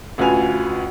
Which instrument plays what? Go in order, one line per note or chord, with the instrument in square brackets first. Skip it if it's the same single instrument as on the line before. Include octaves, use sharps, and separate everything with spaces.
[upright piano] A1 D2 F4 B4 G#5 F7